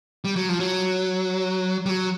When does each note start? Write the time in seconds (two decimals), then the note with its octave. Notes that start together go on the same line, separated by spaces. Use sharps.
0.24 G3
0.36 F#3
0.49 F3
0.60 F#3
1.86 G3
1.89 F#3